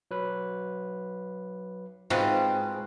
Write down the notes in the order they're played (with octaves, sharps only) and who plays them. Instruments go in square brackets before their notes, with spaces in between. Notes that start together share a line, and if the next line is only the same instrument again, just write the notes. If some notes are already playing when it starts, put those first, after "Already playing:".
[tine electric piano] F#3 B4
[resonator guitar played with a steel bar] G#2 [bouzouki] C4 [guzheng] F4 F#4 B4